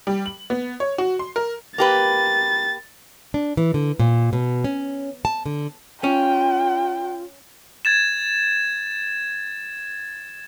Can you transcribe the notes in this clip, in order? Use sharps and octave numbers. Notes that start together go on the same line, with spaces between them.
G3
F#7
B3
C#5
F#4
C6
A#4
A#3 G4 B4 A6
D4
E3
D3
A#2
B2
C#4
A5
D3
C#4 F4 G5
G#6 A6 E7